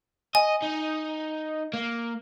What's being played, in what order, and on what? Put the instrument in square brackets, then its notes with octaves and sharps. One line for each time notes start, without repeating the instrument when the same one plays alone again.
[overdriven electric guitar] D#5 [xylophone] G#5
[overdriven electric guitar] D#4
A#3